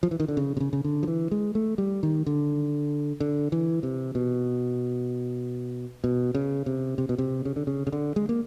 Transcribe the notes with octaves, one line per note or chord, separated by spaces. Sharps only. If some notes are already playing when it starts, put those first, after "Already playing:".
F3
E3
D#3
D3
C#3
C3
C#3
C#3
D3
F3
E3
G#3
A3
G3
D#3
D3
D3
E3
C3
B2
B2
C#3
C3
C3
B2
C3
C#3
D3
C#3
C#3
D3
G#3
A#3